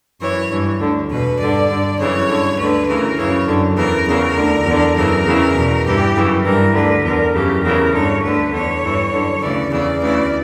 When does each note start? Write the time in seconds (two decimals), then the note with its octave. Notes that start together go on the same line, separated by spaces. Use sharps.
0.20 F#2 E3 C#5
0.50 G2 E3
0.79 D2 D3
1.10 E2 B2 B4
1.39 G2 D3 D5
1.69 G2 D3
1.98 F#2 C#3 E3 C#5
2.29 G2 D3
2.58 D2 D3 B4
2.87 D2 C#3 E3 A#4
3.18 F#2 C#3 E3 C#5
3.47 F#2 D3
3.77 E2 C#3 E3 A#4
4.06 E2 C#3 E3 A#4
4.37 D2 D3
4.66 E2 D3
4.95 F#2 C#3 E3 A#4
5.25 E2 C#3 E3
5.55 E2 B2
5.85 G2 E3 G4
6.15 F#2 C#3 E3
6.44 G2 E3 A#4
6.74 D2 D3 B4
7.04 E2 D3 A#4
7.33 F#2 C#3 E3 G4
7.63 E2 C#3 E3 A#4
7.93 G2 D3 C#5
8.22 D2 D3 B4
8.53 E2 D3 C#5
8.83 G2 E3
9.13 F#2 D3
9.41 D2 C#3 E3 D5
9.72 E2 C#3 E3 D5
10.02 D2 C#3 E3 D5